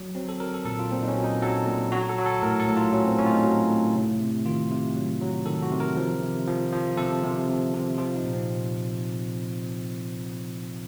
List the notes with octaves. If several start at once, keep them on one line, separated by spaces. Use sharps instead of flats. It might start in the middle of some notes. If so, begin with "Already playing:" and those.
Already playing: F#3
F#3 C4
A4
F#3 A#4
A4
A#2 A4
F4
A#2 C4
D#4
C#4
F#3
D#4
F#3 A4
A#2
F#3 F#4
A4
F#3
A4
A2 A#4
A4
A2
F4
F#3 C#4
C4
A2 C#4
F4
D#4
F#3
A2
C3
C3
D#3 F4
C3
F#3
F#3
D#3 A4
F#4
C3
A#4
F3
C3
F3
F3
C3 A4
C3
C3
C3
F3 F4
D#4
A#2
C4